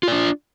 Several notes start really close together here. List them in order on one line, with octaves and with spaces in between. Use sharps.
F4 D5 D4